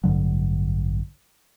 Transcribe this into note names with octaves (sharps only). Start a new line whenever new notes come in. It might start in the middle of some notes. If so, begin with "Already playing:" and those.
A1 G2 D3 F#3